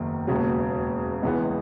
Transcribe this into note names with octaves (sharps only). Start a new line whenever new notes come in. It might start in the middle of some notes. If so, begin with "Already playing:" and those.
Already playing: F#1 E2 D#3
E1 D#2 C#3 F#3
C#2 C#3 E3 G#3 B3